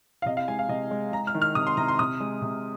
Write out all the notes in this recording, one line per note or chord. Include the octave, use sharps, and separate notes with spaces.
F5
C3 D#5
F5
G#3 G#5
F5
C3 D#5
G#3
G#3 A#5
F6
D#3
F6
C3 D#6
C6
C3 A#5
C6
C3 D#6
G#3
C3